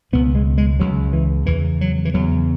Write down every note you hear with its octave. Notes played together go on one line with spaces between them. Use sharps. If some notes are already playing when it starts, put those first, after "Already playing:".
C#2 B2 B3
G#3
G#3
C#2 C#3 F#3
E3
E2 C#3 E3
F#3
E3
E2 C#3 F#3